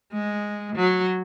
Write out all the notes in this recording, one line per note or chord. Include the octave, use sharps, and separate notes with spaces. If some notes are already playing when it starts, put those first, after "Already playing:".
G#3
F#3